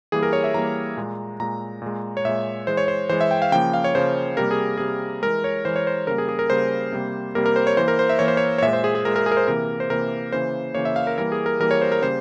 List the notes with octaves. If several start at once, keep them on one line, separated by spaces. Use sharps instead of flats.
E3 G3 A#3 G#4
A#4
C#5
E5
E3 G3 A#3 A#5
A#2 G#3
A#2 G#3 A#5
A#2 G#3
C#5
A#2 G#3 E5
E3 G#3 C5
C#5
C5
E3 G#3 C5
E5
G5
F5
C#3 F3 A#3 G5
F5
C#5
C#3 F3 A#3 C5
C3 G3 A#3 A#4
G#4
C3 G3 A#3 G#4
E3 G#3 A#4
C#5
E3 G#3 C5
C#5
C5
C#3 G3 A#3 A#4
G#4
G#4
A#4
C#3 G3 A#3 C5
C3 G3 A#3
C3 G3 A#3 A#4
A#4
C5
C#5
E3 A#3 C5
A#4
C5
E5
E3 A#3 C#5
C5
C#5
C#5
A#2 G#3 E5
C5
G#4
G#4
A#2 G#3 A#4
A#4
G#4
A#4
C5
C3 E3 A#3 A#4
C5
C3 E3 A#3 A#4
C#3 E3 A#3 C5
C#3 E3 A#3 C#5
E5
F5
A#4
E3 G3 A#3 A#4
G#4
A#4
E3 G3 A#3 A#4
C#5
C5
A#4
C#3 G3 A#3 C5